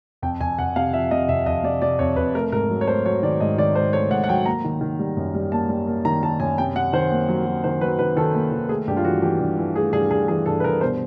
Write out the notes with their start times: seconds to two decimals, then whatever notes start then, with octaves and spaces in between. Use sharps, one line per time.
0.22 F2 G5
0.40 F2 G#5
0.58 F2 F#5
0.76 C3 F5
0.93 F3 E5
1.11 C3 D#5
1.29 F2 E5
1.46 F2 D#5
1.63 C3 D5
1.82 C3 D5
1.99 F2 C#5
2.16 F2 B4
2.35 A3 A#4
2.52 G#2 A#4
2.70 F#3
2.81 C#5
2.88 A3 C5
3.05 F#3 C#5
3.23 D#3 D5
3.40 G#2 D#5
3.58 D#3 D5
3.75 G#2 C5
3.93 A3 C#5
4.11 G#2 F#5
4.24 F#5
4.29 F#3 G5
4.46 A#3 A#5
4.64 D#3
4.81 D#3
4.99 G3
5.17 F#2
5.35 G3
5.52 A#3 A5
5.69 G3
5.87 A#3
6.05 D#3 A#5
6.23 D#3 A5
6.40 F#2 G#5
6.58 C3 G5
6.75 C3 F#5
6.93 D#3 C5
7.11 A#3
7.28 F#3
7.46 F#3
7.64 D#3 C5
7.81 F#3 B4
7.99 D#3 B4
8.16 D#3 A4
8.35 A#3
8.52 D#3
8.69 A3 G#4
8.87 G2 G4
8.97 F4
9.04 E3 F#4
9.22 E3 G4
9.40 G2
9.58 E3
9.75 A3 G#4
9.93 G2 G#4
10.11 G2 G#4
10.28 E3 G#4
10.46 G2 A4
10.60 B4
10.64 G2 A#4
10.81 B2 C5